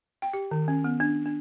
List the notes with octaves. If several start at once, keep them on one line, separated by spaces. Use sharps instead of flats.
G5
G4
D#3
C#4
B3
D4
D4